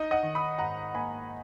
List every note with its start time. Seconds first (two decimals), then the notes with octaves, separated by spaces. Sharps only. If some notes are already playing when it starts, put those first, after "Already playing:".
Already playing: D#4 D#5
0.11 D#5 F#5
0.23 D#3
0.35 B5 D#6
0.58 G#2 F#5 A#5
0.94 A#3 G#5 B5